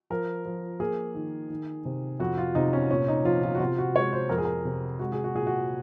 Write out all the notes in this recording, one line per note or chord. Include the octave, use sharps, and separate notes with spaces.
F3 A#4
F3
A#3 G#4
D#3
D#3
C3
F2 F#4
F4
C3 D#4
C#4
A#2 C#4
D#4
F3 F4
F4
F#4
C3 F4
F#4
G#3 C#5
C5
F2 A#4
G#4
A#4
C3
G#3 F#4
G#4
F#4
A#2 G#4
F#4